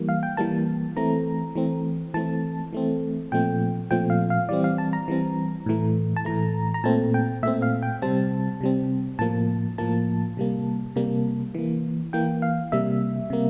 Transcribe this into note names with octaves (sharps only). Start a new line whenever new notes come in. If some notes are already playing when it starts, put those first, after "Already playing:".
Already playing: E3 G3 A#3
F5
G5
E3 G3 A#3 A5
E3 A3 C4 A#5
E3 A3 C4
E3 A3 C4 A5
E3 A3 C4
A#2 F3 A3 C4 G5
A#2 F3 A3 C4 G5
F5
F5
E3 G3 C4 D5
F5
A5
A#5
E3 G3 C4
A2 E3 A3
A5
A2 E3 A3 A#5
A#5
A#2 A3 C4 A5
G5
A#2 A3 C4 E5
F5
G5
C3 G3 C4 A5
C3 G3 C4
A2 F3 A#3 A5
A2 F3 A#3 A5
C3 G3 A#3
C3 G3 A#3
E3 A#3
E3 A#3 G5
F5
C3 G3 A#3 E5
C3 G3 A#3